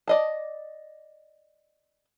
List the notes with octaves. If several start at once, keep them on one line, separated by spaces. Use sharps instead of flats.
D5 D#5 A5